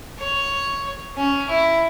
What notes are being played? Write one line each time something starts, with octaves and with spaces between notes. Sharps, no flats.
C#5
C#4
E4